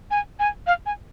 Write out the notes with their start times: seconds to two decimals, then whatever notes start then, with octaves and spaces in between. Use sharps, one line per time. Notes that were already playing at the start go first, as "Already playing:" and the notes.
0.11 G#5
0.39 G#5
0.67 F5
0.86 G#5